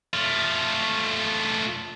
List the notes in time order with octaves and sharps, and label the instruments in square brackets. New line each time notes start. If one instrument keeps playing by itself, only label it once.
[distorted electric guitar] A3 F4